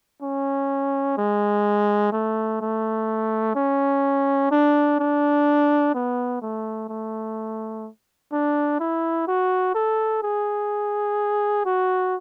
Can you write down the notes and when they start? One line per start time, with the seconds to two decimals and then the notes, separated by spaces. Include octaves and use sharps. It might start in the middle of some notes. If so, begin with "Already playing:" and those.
0.22 C#4
1.18 G#3
2.13 A3
2.61 A3
3.55 C#4
4.51 D4
4.99 D4
5.94 B3
6.42 A3
6.89 A3
8.32 D4
8.80 E4
9.28 F#4
9.75 A4
10.23 G#4
11.66 F#4